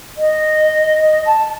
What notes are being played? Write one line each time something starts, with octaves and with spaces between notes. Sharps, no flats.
D#5
A5